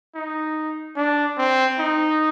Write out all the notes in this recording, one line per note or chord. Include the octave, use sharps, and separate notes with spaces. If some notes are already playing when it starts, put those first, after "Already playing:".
D#4
D4
C4
D#4